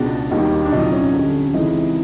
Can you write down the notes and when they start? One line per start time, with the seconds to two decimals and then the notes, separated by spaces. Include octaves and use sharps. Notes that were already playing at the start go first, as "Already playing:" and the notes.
Already playing: C#2 B2 G#3 D4
0.31 D#2 D#3 G3 D#4
0.65 D4
0.72 C2 A#2 F#3 D#4
0.92 C#4
1.13 F2 D3 G3
1.54 C#2 C3 E3 G#3 D#4